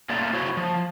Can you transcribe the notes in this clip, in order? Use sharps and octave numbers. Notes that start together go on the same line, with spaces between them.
A3 A#3 C#4 F4 D5 G5
E4 F#4 C5 C#5
F3